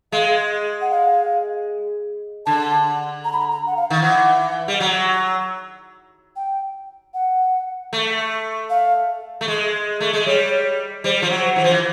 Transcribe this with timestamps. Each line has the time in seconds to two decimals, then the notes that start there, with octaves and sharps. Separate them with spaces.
0.12 G#3 F5
0.81 F#5
0.91 F5
2.46 D3 A5
3.24 A#5
3.33 B5
3.39 A#5
3.51 A#5
3.67 F#5
3.77 F5
3.90 D#3
4.02 E3 F#5
4.68 G3
4.80 F#3
6.36 G5
7.14 F#5
7.93 A3
8.70 F5
9.41 A3
9.48 G#3
10.01 A3
10.13 G#3
10.26 G3 C#5
11.04 G3 C5
11.22 F3
11.30 F#3
11.56 E3
11.64 F3
11.71 E3